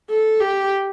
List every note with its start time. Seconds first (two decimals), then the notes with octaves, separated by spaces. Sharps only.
0.10 A4
0.40 G4